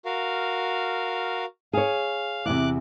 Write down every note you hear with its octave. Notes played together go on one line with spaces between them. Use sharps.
F#4 A#4 F5
G#4 C#5 F5
E2 C3 D6 F#6